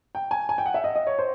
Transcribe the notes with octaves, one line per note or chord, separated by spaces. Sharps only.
G5
G#5
G#5
G5
F#5
E5
D#5
D#5
C#5
C5